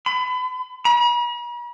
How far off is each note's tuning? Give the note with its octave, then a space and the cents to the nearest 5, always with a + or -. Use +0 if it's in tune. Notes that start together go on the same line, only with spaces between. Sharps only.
B5 +30
B5 -45